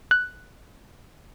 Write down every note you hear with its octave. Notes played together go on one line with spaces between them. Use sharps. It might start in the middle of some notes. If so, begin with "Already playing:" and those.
F#6